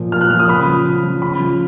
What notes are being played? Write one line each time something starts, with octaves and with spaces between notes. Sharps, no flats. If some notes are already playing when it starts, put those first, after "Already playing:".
Already playing: A#2 F3
A#2 F6
F#6
F3 F6
D#6
C#3 B5
F3
C#3
F3
C#3 B5
F3